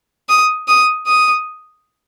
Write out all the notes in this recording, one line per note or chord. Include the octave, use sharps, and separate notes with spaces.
D#6
D#6
D#6